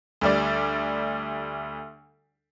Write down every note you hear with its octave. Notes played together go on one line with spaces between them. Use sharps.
D2 G3 D5